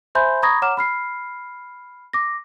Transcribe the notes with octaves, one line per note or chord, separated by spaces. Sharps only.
C5 E5 G#5 B5 C6 G6
A#5 B5 C#6 D#6 G#6 A#6
C#5 F#5 A#5 D6 F6 E7
B5 F6 C7
D6 A#6